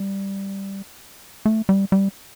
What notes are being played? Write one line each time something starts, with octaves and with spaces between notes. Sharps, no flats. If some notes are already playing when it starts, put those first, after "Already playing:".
Already playing: G3
A3
G3
G3